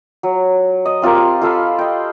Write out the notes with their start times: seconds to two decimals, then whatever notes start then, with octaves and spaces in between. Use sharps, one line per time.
0.23 F#3
0.86 D#5
1.02 C4 F4 G4 A#4
1.42 F4 A4 F5 B5
1.79 D#5 G5